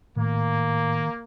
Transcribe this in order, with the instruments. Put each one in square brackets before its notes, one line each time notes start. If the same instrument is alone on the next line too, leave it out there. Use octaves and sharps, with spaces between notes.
[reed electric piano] A2 [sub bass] D#3 [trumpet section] A#3